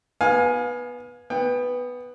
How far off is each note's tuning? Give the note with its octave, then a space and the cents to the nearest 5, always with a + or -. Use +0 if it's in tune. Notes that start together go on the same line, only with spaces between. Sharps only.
B3 -10 F5 +30 G#5 +0
B3 +0 G5 +30